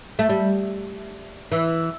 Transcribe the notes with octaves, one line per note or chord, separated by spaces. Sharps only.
A3
G3
E3